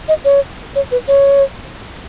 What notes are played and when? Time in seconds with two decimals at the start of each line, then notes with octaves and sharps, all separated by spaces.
0.08 D#5
0.25 C#5
0.76 C#5
0.92 B4
1.08 C#5